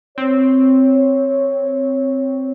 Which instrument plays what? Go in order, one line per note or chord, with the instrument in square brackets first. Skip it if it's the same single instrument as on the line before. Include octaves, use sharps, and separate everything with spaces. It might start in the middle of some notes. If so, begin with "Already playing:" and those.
[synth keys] C4 [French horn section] C#5